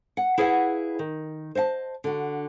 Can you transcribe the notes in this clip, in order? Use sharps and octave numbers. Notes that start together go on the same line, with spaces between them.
F#5
E4 G#4 B4 C#5 F5 F#5
D#3
C5 D#5 F5 A5
D3 F#4